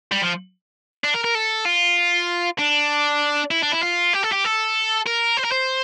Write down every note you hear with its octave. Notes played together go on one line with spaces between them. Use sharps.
G3
F3
D4
A#4
A#4
A4
F4
D4
E4
D4
E4
F4
G4
A4
G4
A4
A#4
C5
A#4
C5